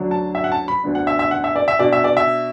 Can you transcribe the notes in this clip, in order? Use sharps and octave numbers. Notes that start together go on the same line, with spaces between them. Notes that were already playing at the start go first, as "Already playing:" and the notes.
Already playing: D2 D3 F#3 D4
A5
E5
F#5
A5
B5
D2 D3 B3 D4
F#5
E5
E5
F#5
E5
D5
E5
B2 B3 D4 D5
E5
D5
E5